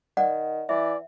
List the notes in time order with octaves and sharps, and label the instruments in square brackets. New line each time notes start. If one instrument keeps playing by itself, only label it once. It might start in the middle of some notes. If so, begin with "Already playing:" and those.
[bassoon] D#3 [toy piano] D5 F#5
[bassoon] E3 [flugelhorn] D5 [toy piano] E5